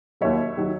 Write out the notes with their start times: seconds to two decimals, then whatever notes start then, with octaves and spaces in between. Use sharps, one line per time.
0.21 D#2 D#3 F#3 C#5 E5
0.57 D#3 F#3